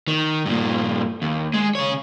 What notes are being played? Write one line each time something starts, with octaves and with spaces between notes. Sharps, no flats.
D#3
G2 A#2
D#2
G#3
C#3 C#5